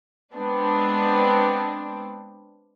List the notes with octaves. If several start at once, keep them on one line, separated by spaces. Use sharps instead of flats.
G#3 B3 C4 D4